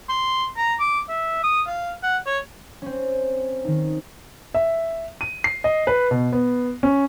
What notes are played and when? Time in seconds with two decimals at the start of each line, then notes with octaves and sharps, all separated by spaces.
0.09 C6
0.57 A#5
0.80 D6
1.09 E5
1.43 D#6
1.67 F5
2.03 F#5
2.26 C#5
2.82 C4 C#4
3.65 D#3 D#4
4.55 E5
5.21 D#7
5.44 C7
5.64 D#5
5.87 B4
6.11 B2
6.33 B3
6.83 C#4